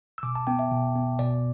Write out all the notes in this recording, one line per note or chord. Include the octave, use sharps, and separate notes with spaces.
E6
B2 D6
A5
B3 G5
E5
B2
B3
B2 D5